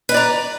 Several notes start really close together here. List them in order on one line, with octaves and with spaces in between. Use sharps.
B4 D#5 D5 A#5